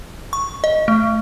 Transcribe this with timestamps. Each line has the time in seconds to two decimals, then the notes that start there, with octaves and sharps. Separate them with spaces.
0.33 C#6
0.64 D#5
0.88 A3